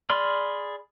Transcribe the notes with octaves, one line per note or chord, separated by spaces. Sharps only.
G#4 D5 B5 C6 F6